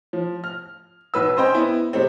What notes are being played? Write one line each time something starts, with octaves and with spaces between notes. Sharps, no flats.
F3
F6
B1 B4 E6
C4 C#4 C5 D#5 G5 B5
B3 E4
C3 G#3 A3 C4